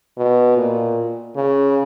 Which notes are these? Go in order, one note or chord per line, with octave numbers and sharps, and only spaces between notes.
B2
A#2
C#3